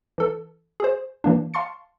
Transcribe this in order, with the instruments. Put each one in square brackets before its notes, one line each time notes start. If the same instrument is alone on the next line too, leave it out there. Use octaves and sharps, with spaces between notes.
[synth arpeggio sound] E3 A4
G#4 C5
E3 A#3 D4
F5 A5 C6 C#6 A6 C#7